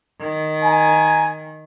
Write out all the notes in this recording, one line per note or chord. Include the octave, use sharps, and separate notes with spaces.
D#3
G#5 A#5